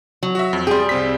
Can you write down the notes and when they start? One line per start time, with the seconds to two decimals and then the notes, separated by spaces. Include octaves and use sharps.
0.23 F#3
0.35 F#4 E5
0.53 F2
0.67 G3 G#4 G5 C6
0.89 C2 C4 B6